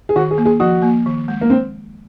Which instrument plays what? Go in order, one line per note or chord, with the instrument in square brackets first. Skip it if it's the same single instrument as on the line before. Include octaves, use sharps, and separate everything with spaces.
[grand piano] G#4
[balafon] D#3 [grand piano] F#4
[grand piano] G#4
[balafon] A#3
[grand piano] G#4
[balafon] F3 [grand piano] F#4
[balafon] A#3
D#3
G#3
[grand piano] A#3
C4